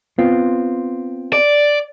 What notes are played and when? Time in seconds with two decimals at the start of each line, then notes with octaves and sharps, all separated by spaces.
0.19 B3 C4 F4
1.33 D5